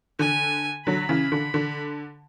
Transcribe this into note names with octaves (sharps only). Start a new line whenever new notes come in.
D3 G#5
D3 F#3 B5
C#3 E3
D3
D3